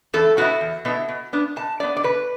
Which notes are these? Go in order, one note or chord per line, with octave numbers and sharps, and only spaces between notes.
E2 A4
B2 B3 E4 F#4
E2
B2 B3 E4
B2
B3 D4
B2 A5
B3 D4 D5
D5
B2 B4